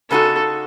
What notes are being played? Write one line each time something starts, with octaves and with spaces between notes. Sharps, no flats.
C#3 G#3 D#4 F#4 A4